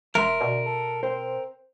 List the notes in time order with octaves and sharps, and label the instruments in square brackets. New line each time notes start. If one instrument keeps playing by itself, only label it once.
[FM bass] E1 [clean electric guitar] A#4 [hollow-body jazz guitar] E5 C6
[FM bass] B2 [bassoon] D3
[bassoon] A4
[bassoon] C4 [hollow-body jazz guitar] C5